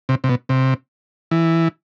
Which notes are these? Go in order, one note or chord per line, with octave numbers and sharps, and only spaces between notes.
C3
C3
B2
C3
E3